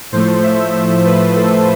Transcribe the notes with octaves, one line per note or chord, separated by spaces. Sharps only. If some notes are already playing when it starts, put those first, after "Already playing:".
A2 F3 A3 C5
E5
E5
B4
A4